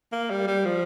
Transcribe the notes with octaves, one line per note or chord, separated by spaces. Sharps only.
A#3
G3
G3
F3